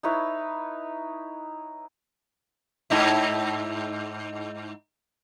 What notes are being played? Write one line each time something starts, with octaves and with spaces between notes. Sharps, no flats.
D#4 E4 B4 C#5
G#2 D#4 E4